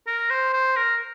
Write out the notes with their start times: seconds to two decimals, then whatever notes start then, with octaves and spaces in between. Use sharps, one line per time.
0.07 A#4
0.30 C5
0.53 C5
0.76 A#4